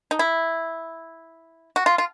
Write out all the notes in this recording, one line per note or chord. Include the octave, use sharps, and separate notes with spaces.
D#4
E4
F#4
F4
F4